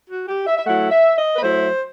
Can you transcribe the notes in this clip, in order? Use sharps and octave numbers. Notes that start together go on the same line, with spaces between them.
F#4
G4
E5
E5
F#3 A3 E4 F#5
E5
D#5
B4
F#3 A3 E4 C5